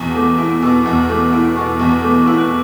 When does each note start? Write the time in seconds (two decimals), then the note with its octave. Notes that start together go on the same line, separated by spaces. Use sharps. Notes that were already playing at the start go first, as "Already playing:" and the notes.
Already playing: E2 B2
0.15 A3 D6
0.38 E4
0.62 B2 E6
0.86 E2
1.09 A3 D6
1.33 E4
1.55 B2 C#6
1.79 E2
2.02 A3 D6
2.26 E4 E6
2.38 F#6